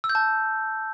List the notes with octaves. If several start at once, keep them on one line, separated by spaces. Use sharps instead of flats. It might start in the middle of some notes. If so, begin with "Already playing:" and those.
E6
G6
A5